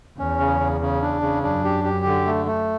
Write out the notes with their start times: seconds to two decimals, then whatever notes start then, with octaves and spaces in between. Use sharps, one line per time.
0.19 E2 C#4
0.39 C#3
0.60 C#3
0.81 C#3
1.02 D4
1.22 C#3
1.43 F#2 D4
1.64 G4
1.84 G4
2.05 D3
2.26 A3
2.46 A3